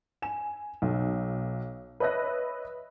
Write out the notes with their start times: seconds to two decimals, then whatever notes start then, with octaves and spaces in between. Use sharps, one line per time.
0.22 G#5 E7
0.82 B1
2.00 B4 C#5 D#5 E5 F#6 A#6